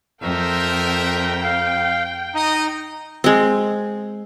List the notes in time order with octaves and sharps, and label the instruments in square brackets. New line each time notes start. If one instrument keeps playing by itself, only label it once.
[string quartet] F2 [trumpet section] A4 A#4 E5 [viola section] G5
[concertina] F5
[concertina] D#4 [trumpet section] D#5
[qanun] G#3 C4